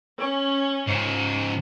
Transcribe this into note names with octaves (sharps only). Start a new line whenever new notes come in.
C#4
G#2 C#3